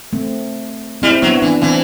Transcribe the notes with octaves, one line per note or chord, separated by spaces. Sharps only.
A3 C4
G3 C4 E4
F#3 B3 D4
E3 B3 D4
E3 A3 C4